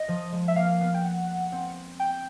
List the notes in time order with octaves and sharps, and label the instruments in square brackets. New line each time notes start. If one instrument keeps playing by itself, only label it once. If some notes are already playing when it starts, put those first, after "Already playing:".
Already playing: [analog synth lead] D#5
[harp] F3
G#3
[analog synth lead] E5
[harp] A#3 [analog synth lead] F5
[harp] B3
[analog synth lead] G5
F#5
[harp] C4
[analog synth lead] G5